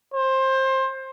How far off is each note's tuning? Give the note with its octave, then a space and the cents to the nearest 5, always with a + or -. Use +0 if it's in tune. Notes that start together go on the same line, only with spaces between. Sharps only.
C5 +20